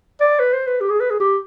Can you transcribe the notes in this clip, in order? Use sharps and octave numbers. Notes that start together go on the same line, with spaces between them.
D5
B4
C5
B4
G4
G#4
B4
G#4
G4